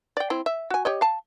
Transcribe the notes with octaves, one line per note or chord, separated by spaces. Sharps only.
D5 G5
C4 E4
E5
F#4 G#5
G4 C#5 D#5
F5 A5